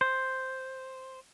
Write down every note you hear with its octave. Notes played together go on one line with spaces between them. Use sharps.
C5